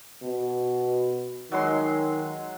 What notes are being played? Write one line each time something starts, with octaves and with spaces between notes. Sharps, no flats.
B2
D#3 F#3 G#3 C6